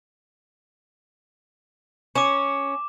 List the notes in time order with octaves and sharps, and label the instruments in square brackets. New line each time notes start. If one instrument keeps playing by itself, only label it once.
[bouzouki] C#4 [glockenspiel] D6 E7